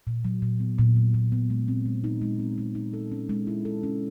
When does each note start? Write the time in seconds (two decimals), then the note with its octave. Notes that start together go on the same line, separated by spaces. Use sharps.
0.07 A#2
0.25 F#3
0.42 A#2
0.60 B3
0.78 A#2
0.96 F#3
1.14 A#2
1.32 B3
1.50 G#3
1.68 C4
1.86 G#3
2.04 D#4
2.22 G#3
2.39 C4
2.58 G#3
2.75 D#4
2.93 A4
3.12 C#4
3.29 G#3
3.47 E4
3.65 A4
3.83 C#4